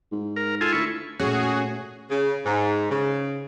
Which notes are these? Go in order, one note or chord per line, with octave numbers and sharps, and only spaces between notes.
G#2
A#4
F4 A4 G#5
D2 E4 C#6
A#2 A3 C#4 F#4 G#4
C#3
G#2
C#3